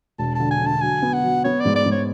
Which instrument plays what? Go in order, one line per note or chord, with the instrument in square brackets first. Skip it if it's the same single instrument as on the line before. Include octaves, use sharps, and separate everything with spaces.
[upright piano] E1 [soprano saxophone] A5
[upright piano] D3 [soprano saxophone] A5
[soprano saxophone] G#5
[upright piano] D3
[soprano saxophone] A5
[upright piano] F#3 [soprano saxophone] G#5
[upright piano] B3
[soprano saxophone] F#5
[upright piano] F#3
[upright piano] B3 [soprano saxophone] C#5
[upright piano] G#2 [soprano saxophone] D5
[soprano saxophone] D5
[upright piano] G#2
[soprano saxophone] C#5